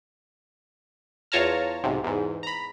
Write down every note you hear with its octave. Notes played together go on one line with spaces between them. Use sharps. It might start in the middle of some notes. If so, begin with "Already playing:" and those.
E2 F4 C#5 A5 A#5 F6
B1 G#2 C3
E2 G#2
A#5 B5